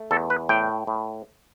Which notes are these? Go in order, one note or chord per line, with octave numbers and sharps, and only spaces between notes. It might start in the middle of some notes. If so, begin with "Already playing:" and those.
Already playing: A3
E2 A4
B4
A2 G5
A2